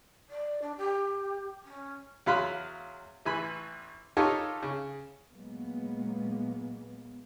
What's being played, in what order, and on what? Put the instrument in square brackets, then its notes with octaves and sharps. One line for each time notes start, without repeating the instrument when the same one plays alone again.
[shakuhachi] D5
D4
G4
C#4
[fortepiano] E2 F#3 F5 B5 C6 F#6
A1 E3 G#5 B5
D#4 F4 G4 A4 A#4 C#5
C#3
[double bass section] A#2 F#3 G#3 A#3 B3